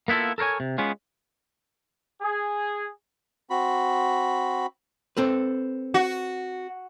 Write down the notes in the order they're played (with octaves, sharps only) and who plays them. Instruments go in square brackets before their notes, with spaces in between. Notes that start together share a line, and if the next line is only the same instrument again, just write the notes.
[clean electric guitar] A#3 B3 E4 F4 A4
A4 A#4 C5 C#5 G#5
C3
G#3 B3 C#4 F4
[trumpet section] G#4
[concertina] C4 F#4 B5
[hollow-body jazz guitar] C4 A4 B4
[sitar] F#4